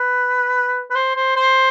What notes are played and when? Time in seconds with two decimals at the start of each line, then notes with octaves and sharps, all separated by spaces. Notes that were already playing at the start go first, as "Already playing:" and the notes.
Already playing: B4
0.90 B4
0.95 C5
1.16 C5
1.36 C5